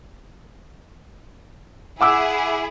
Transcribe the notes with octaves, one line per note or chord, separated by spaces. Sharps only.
E4 G#4 F#5 D6 E6